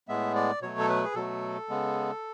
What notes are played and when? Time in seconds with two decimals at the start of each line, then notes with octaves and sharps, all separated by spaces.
0.08 A2 G#3 B3 E5
0.35 D5
0.62 B2 F#3 A3 C#5
0.79 A4
0.89 B4
1.04 G#4
1.15 B2 F#3 A3 A4
1.69 C#3 G#3 B3